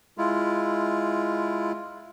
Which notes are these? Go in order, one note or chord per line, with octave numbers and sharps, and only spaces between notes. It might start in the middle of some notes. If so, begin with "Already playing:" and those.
G#3 E4 F4